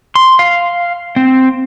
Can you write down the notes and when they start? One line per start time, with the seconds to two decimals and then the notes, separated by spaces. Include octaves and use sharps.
0.15 C6
0.39 F5
1.16 C4